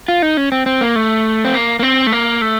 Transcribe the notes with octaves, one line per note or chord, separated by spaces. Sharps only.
F4
D#4
C#4
C4
C4
A#3
A3
C4
A#3
A#3
C4
A3
A#3
A3